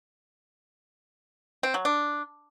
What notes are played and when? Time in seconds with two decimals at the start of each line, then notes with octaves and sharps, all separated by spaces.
1.63 C4
1.74 F#3
1.85 D4